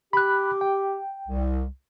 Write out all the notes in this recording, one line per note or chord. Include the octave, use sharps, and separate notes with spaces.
G4 B5 F#6
G5
C2